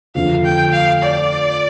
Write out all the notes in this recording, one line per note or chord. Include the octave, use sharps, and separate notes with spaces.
F2 D3 F3 A3 F5
G5
F5
D5